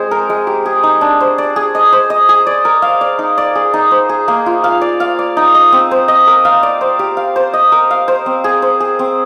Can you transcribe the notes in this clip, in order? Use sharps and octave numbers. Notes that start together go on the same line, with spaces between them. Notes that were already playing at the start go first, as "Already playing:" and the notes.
Already playing: G#3 C4 G#4 C5
A#4
G#3
G4
G#4
D#4
D4
C5
D5
G#4
D#5
C5
D#5
G#4
D5
A#4
F5
D5
D#4
D5
G#4
D#4
C5
G#4
A#3
F4
F5
D5
F5
D5
D#4
D#5
C4
C5
D#5
A#4
F5
D5
C5
G4
F5
C5
D#5
A#4
F5
C5
C4
G#4
C5
G#4
C4